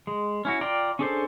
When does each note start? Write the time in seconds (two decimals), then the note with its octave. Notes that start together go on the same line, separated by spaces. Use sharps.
0.07 G#3
0.45 C#4 E4 F#4
0.61 F4 D5 G5 A#5
0.99 C#4 D4 G#4 A4 C5